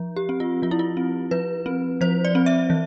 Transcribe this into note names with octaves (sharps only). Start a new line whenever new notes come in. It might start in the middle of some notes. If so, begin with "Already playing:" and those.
Already playing: F3
G4
C4
F4
F3 F4
E4
F4
C4
F3 B4
C4
F3 C5
D5
C4
E5
E3